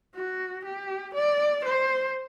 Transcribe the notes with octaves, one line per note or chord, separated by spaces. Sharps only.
F#4
G4
D5
C5